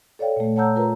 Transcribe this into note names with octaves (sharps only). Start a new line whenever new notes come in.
A4 C#5 D5 F5 G5
A#2 A3
C#5 F#5 A5 A#5 E6 G6
F4 A#4 B4 A#5